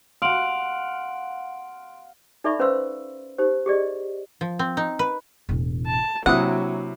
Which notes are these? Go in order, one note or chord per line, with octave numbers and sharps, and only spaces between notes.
F5 F#5 C6 D7 F#7
D#4 A4 D5 E5 B5 C#6
C#4 B4 C5 F5 C6 E6
D#4 G4 C5
G4 G#4 D5 D#5
F3
C4
D#4
B4
E1 A1
A5
C3 F#3 A#3 D4 E4 F#5 D#6